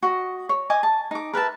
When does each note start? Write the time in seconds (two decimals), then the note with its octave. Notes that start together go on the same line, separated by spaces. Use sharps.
0.03 F#4 D#5
0.49 C#5
0.70 D#5 G#5 D6 D#6
0.83 A5
1.11 D#4 D6
1.33 A#4 B4 E5 A5